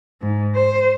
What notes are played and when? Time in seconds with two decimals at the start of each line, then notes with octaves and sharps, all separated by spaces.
0.21 G#2
0.55 C5